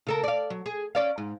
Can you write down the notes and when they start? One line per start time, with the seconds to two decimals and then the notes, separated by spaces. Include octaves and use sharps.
0.07 C#3 A4 A#4
0.24 D5 F5
0.50 F#3
0.66 G#4
0.95 C#4 D5 F5
1.18 G#2